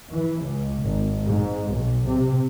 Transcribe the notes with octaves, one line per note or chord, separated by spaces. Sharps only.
E3
C#2
G#1
G#2
B1
C3